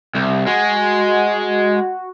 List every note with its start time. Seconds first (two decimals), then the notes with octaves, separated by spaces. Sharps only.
0.15 C2
0.47 G#3 F#4